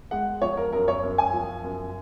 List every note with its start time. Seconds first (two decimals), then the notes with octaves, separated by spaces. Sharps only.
0.11 G#3 F#5
0.42 F3 C#5
0.57 A#4
0.73 F#2 A#4
0.88 C#5
1.03 F#2
1.18 G#5
1.33 F3
1.64 F#2